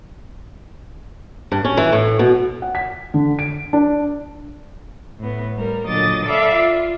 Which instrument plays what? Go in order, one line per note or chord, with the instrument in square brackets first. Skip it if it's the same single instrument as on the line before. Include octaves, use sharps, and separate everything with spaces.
[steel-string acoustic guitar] G2
C#4
E3
A2
B2
[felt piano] F#5
B6
D3
D7
D4
[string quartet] A2 B3
G3 A#4
A#2 D3 F#3 D#5 D6 A6
A4 D5 E5 F5 B5 D6
F4